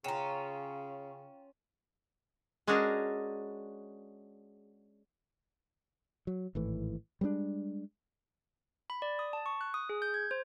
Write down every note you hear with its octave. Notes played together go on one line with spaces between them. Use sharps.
C#3 C#4 F4 F#5 G5 A#5 E7
G#3 C#4 D4 F#4 G#4 A#4
F#3
G#1 A2 E3
G3 G#3 C4 D4
B5
D5
D#6
A5
C#6
F#6
D#6
G#4
G6
G#6
C5